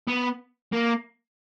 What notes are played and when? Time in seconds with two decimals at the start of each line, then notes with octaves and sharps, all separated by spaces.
0.07 B3
0.72 A#3